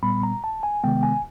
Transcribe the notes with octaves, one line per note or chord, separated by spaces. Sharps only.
A#2 G3 B3 B5
A#5
A5
G#5
C3 D#3 G#3 B3 G5
G#5